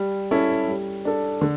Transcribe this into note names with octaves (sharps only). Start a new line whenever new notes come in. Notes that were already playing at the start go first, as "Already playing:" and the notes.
Already playing: G3
C#4 E4 A4
G3
D4 A4
D3